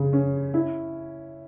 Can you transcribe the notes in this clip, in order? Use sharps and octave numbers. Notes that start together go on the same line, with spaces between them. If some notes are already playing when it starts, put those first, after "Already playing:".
Already playing: C#3
C#4
E4